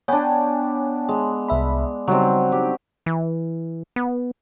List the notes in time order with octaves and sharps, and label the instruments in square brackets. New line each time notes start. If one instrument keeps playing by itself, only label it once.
[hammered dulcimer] B3 D4 [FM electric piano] C#5 G5 G#5
[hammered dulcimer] G#3
[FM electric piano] C2 E5 B5
[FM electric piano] C#3 G3 D#4 [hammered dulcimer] F#3 C4
[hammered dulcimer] G4
[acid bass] E3
B3